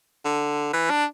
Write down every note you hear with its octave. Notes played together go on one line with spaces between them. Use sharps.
D3
E3
D4